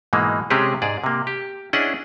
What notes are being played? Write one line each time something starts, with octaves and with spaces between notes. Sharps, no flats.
G#2 B2 E3 G#3 A#3
C3 G#3 C4 C#4 G4 G#4
G#2 G#4 D5
C3 A#3
G4
C#4 D4 E4 G#4 D#5 F#5